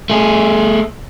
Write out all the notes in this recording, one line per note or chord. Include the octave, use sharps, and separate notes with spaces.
A3 G#4